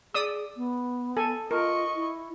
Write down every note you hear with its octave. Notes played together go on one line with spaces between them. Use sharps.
G#4 D5 D#6 E6
B3
A4 G#5
F4 A#4 D#5 C#6
E4